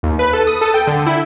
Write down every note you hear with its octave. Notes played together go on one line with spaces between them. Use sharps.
D#2
B4
A4
D#6
A4
G5
D3
E4